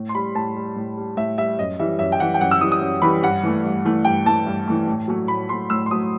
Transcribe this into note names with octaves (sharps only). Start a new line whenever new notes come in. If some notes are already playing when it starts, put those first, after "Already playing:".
Already playing: A2
C6
G3 B5
A2 A5
G3
A2
G3
A2 E5
G3 E5
F#2 D#5
E3 G3 E5
F#2 E5
G5
E3 G3 F#5
G5
F#2 F#5
E6
E3 G3 D#6
D#6
F#2
E3 G3 B5
G2 F#5
E3 A3
G2
E3 A3
G2 G5
E3 A3 A5
G2
E3 A3
A2
F#3 A3
A2 B5
F#3 A3 C6
A2 E6
C6
F#3 A3 D#6